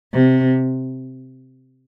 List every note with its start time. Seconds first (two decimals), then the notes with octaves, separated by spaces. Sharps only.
0.13 C3